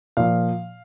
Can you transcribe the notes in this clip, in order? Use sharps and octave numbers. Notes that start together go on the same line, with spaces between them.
A#2 F3 F5